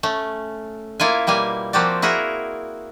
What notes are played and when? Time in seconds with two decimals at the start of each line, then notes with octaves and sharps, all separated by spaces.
0.03 A3 C#4
1.00 A#3 E4 F4 G#5
1.27 B2 G3 A#3 G#5
1.73 F3 A#3 C4 F#4 G4 D5
2.02 E4 F#4 G#4 A#4